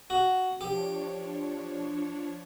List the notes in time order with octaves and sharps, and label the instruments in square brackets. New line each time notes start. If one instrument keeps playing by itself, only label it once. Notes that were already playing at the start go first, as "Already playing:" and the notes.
[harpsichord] F#4
[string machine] F3 D4 C#5 [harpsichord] G4